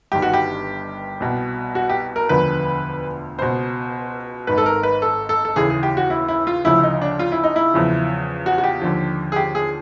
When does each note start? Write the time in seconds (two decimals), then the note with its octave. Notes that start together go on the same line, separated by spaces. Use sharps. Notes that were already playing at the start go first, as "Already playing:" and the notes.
0.12 G1 G2 D#3 G4
0.22 F#4
0.34 G4
1.20 C2 B2
1.75 F#4
1.90 G4
2.16 A#4
2.29 E1 D2 D3 F3 B4
3.38 C#2 B2 C5
4.47 G#1 G#2 D#3 B4
4.58 A4
4.66 A#4
4.83 B4
5.02 A4
5.29 A4
5.45 A4
5.56 D#2 C#3 E3 G#4
5.70 G#4
5.83 G4
5.97 F#4
6.10 E4
6.28 E4
6.47 F4
6.65 D2 C#3 F3 E4
6.83 D#4
7.02 D4
7.19 F4
7.32 E4
7.44 D#4
7.56 E4
7.74 E2 C#3 F3
8.46 F#4
8.58 F#4
8.64 G4
8.82 D#2 D3 F3
9.32 G#4
9.36 G4
9.55 G#4